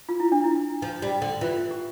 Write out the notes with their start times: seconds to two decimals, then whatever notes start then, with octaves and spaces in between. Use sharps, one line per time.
0.09 F4
0.20 E4
0.32 D4
0.44 E4
0.82 F3
1.02 G3
1.22 D3
1.41 E3 F4
1.71 G4